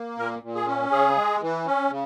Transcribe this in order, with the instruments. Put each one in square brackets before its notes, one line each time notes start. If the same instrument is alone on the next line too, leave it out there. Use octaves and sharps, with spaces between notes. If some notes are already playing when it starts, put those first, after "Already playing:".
Already playing: [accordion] A#3
A#2 A#4
A#2
G#4
C#4
C#3 G#4
G#3
E3
C#4
C#3